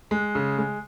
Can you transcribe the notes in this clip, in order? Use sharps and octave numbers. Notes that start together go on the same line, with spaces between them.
G#3
C#3
G#3